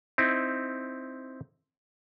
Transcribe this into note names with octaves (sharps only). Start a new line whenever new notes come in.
C4 D#4 E4